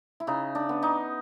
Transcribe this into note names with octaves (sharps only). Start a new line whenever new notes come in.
E4
C#3 D#4
D4
B3
D#4